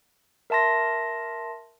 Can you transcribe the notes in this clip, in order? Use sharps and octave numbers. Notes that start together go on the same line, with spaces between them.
A#4 E5 A5 C6 A#6